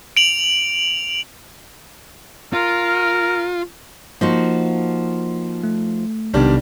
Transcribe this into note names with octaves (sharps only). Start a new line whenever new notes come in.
D7 F7 F#7
F4 A#4
F3 A#3 D#4 F#4
A3
B1 C3 D#3 G3 B3 D4